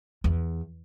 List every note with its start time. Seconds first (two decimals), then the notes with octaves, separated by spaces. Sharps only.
0.24 E2